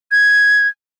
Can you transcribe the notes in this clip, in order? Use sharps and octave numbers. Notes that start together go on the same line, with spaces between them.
G#6